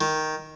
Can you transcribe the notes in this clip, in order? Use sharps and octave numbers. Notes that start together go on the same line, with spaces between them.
D#3